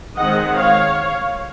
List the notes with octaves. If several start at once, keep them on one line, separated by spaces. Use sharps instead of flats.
D#3 G#3 C4 D#5 F#5
C#5 F5